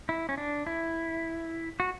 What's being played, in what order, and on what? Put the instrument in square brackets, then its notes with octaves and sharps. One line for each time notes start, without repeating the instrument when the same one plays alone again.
[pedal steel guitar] E4
C#4
D4
E4
F#4